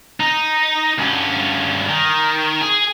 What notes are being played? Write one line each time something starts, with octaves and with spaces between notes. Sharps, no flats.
D#4
G2 C#4
D#3
G#4